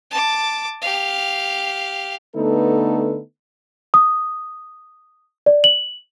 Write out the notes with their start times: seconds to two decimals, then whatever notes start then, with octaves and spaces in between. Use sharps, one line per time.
0.11 A5 D6
0.82 G4 F5
2.35 D3 A3 B3 D#4 A4 B4
3.94 D#6
5.46 D5
5.64 F#7